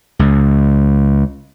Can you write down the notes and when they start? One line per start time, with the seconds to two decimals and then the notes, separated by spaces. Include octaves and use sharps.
0.19 C#2